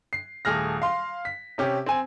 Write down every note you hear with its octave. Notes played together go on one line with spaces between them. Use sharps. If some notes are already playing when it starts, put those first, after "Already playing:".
C7
D#1 A3 G#4 F6 A#6
F5 C6
B6
C3 C#4 G4
C4 G#5